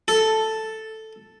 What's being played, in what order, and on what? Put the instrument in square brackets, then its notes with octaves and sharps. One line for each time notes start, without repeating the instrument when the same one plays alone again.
[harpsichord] A4